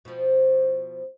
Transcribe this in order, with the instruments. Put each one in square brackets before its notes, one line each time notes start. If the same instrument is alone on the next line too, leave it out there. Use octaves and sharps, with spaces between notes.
[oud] B2 F3